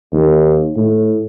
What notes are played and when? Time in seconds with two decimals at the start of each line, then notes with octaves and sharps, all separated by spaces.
0.13 D#2
0.77 A2